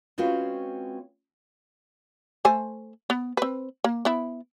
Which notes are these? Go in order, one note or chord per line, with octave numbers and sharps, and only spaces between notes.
G#3 C4 C#4 F4 F#4 B4
A3 C5 G#5
B3
C4 B4
A#3
B3 E4